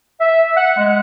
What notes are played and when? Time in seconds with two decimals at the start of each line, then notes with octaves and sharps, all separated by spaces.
0.20 E5
0.56 F#5
0.77 G#3